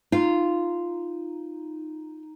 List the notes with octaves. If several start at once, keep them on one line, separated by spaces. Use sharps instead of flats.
D#4 F4